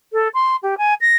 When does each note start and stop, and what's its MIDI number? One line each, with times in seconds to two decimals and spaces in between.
0.12 0.28 69
0.34 0.56 84
0.62 0.77 67
0.77 0.94 80
1.01 1.17 94